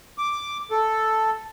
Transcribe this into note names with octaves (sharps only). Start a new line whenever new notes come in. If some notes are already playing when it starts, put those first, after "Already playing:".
D6
A4